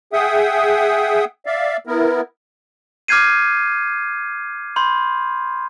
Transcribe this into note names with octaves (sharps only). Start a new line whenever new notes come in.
G#4 E5 F#5 G5 D#6
D5 E5 F5
B3 E4 A#4
D6 F6 G6 G#6 C7 D#7
B5 C6 G6